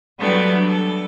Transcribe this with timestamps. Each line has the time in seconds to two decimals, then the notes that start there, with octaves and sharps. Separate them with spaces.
0.18 E3 F#3 G3 A3 B3 D4
0.69 A4